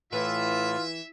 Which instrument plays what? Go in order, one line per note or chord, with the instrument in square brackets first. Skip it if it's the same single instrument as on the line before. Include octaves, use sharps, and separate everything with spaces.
[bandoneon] A2 [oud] E3 [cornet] F4 [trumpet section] E5